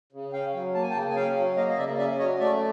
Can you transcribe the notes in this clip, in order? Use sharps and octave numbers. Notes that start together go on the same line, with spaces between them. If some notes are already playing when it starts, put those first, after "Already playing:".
C#3
C#4 F5 G5
F#3
A#3 A5
G#5
G5 A5
C#3
G#5
C#4 F5 G5
F#3
A#3 D#5 F5
D#5
C#3 D5 E5
C#4 D5 E5
F#3 C#5 D#5
A3 D5 E5